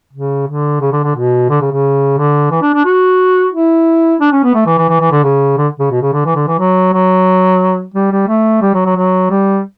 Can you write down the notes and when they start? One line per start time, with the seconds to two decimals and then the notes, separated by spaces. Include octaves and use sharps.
0.13 C#3
0.47 D3
0.81 C#3
0.92 D3
1.03 D3
1.16 B2
1.49 D3
1.61 C#3
1.72 C#3
2.18 D3
2.51 E3
2.62 D4
2.74 D4
2.85 F#4
3.53 E4
4.20 D4
4.32 C#4
4.44 B3
4.55 A3
4.66 E3
4.78 E3
4.89 E3
5.00 E3
5.11 D3
5.23 C#3
5.57 D3
5.79 C#3
5.91 B2
6.01 C#3
6.13 D3
6.25 E3
6.35 D3
6.47 E3
6.59 F#3
6.93 F#3
7.94 G3
8.12 G3
8.28 A3
8.62 G3
8.74 F#3
8.86 F#3
8.96 F#3
9.30 G3